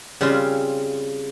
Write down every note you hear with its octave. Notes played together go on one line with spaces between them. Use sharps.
C#3 G3 C4 F4